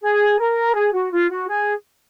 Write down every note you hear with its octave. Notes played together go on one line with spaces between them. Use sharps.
G#4
A#4
G#4
F#4
F4
F#4
G#4